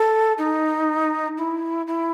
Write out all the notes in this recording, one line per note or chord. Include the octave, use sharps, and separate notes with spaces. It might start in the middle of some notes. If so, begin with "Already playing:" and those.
Already playing: A4
D#4
E4
E4